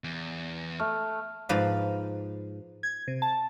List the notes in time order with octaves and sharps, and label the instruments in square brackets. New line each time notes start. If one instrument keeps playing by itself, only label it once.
[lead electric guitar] E2
[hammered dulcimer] A3 [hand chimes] F6
[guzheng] G#2 F3 B4 F5
[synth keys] G#6
C3
A5